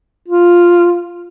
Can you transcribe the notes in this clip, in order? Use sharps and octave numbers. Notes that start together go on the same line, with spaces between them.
F4